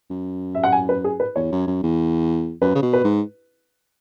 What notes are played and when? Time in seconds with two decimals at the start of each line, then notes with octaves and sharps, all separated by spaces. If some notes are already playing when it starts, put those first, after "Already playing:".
0.10 F#2
0.55 E5
0.64 F#5
0.72 G#5
0.89 B4
1.04 G#4
1.20 B4
1.36 E2 C#5
1.52 F#2
1.67 F#2
1.83 E2
2.61 F#2 B4
2.75 C#3
2.82 B2
2.93 B4
3.04 G#2